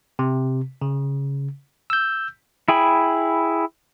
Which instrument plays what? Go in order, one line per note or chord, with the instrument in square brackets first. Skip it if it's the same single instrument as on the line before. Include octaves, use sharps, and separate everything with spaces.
[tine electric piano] C3
C#3
E6 G6
[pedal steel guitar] E4 G#4 G5 B5